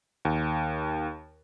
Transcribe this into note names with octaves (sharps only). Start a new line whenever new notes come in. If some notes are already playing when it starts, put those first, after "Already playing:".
D#2